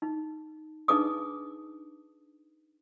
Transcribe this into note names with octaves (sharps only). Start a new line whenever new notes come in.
D#4
D4 D#4 G#4 B4 D6 D#6